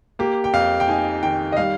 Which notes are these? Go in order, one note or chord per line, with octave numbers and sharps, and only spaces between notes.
A#3 G4
G5
F2 F5
G5
D#4 G#5
D#3 G5
D#5
G3 F5